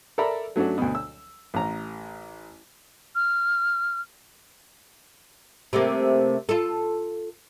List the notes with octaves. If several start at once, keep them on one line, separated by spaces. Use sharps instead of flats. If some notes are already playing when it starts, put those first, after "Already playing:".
A4 A#4 D5 E5 A#5 B5
F#3 A3 C#4 D4 F#4
D2 B2
E6
A1 A#5
F6
C3 A3 A#3
F4 A4